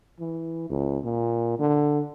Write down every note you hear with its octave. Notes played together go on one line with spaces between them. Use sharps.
E3
C#2
A#2
D3